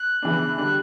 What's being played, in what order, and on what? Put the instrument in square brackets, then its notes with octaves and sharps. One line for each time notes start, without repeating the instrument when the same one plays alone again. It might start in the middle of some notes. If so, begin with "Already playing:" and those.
Already playing: [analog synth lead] F#6
[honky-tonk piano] C#3 E3 B3 D4
[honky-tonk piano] D3 G3 D4 G4 [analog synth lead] F#6